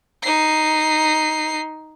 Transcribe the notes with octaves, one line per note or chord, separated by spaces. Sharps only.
D#4 C7